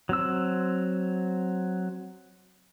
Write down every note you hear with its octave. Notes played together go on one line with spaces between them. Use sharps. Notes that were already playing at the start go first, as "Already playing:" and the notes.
F#3 C4 E6